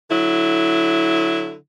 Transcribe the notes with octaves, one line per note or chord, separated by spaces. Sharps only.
D3 F#3 E4